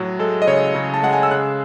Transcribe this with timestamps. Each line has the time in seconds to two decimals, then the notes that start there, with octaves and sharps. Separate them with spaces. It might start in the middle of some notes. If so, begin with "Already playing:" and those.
Already playing: A2 F#3
0.19 G#3 A4
0.42 D#5
0.47 C#3 C#5
0.75 C#3
0.94 A5
1.03 G#3 F#5
1.13 G#5
1.23 E6
1.31 C#3 F#6